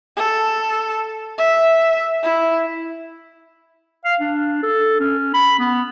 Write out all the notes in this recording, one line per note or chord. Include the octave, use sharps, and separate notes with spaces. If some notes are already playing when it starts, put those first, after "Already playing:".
A4
E5
E4
F5
D4
A4
C#4
B5
B3